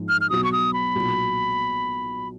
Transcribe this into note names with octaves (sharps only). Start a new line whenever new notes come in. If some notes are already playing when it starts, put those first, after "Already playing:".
Already playing: G#2 F3 G#3 D#4
F6
F6
B1 B2 F#3 D#6
C#6
D#6
B5
B1 A#2 F#3